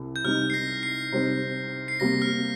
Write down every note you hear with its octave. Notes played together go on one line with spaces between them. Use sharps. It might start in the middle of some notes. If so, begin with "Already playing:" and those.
Already playing: C2 C3
G6
C3 G3 D#4 F6
C7
A#6
C7
C3 G3 C4 D#4
C7
C3 G3 A#3 A#6
F6